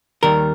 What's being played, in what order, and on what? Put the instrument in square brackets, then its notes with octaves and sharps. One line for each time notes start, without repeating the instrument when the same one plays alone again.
[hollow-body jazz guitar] D#2 D#3 G3 A#4